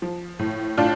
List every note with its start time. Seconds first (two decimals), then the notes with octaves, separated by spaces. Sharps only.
0.02 F3
0.39 A2
0.77 A2 D4 F4